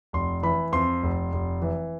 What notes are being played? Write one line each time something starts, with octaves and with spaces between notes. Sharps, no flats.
F1 C6
E3 B5
F2 C6
F1
F1
E3